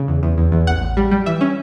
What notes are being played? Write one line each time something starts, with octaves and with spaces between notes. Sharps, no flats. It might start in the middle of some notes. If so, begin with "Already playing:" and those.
Already playing: C#3
E2
E2
E2
E2
A1 F#5
A1
G3
G3
E3 E5
C#4